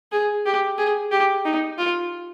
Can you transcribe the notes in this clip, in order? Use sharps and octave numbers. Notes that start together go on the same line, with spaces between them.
G#4
G4
G#4
G4
D#4
F4